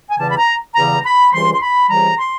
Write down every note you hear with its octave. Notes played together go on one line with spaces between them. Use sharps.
G#5
E2 C#3 E3 G3 A5
B5
A#5
E2 C#3 E3 G3 A#5
B5
C#2 C3 E3 G3 C6
C6
B5
C#2 C3 E3 G3 A#5
C6